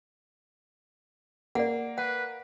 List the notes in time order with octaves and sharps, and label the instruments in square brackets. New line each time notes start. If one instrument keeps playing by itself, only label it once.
[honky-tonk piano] A#3 [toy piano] D5 F#5
[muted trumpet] B4 [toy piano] F#5